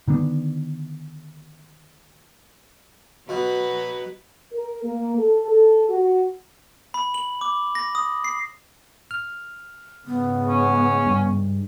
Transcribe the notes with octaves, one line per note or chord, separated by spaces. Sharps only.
D3 D#3 B3 D4
B2 F#3 F#4 B4
A#4
A#3
A4
A4
F#4
B5
F#7
D6
A#6
D#6
C7
F6
G#2 C#3 G#3 B3
C#4
G2